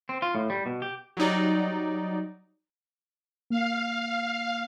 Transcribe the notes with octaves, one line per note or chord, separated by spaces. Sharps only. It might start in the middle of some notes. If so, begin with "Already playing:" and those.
C4
F4
A2
G3
B2
G4
F#3 G3 D#4 D5
A#3 F5